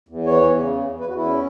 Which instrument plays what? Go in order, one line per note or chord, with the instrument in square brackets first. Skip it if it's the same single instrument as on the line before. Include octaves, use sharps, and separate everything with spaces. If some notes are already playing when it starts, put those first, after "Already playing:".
[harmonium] E2
E3 C#5
E2
C#3
E2
E2
B4
E2 F#4
E4
C#4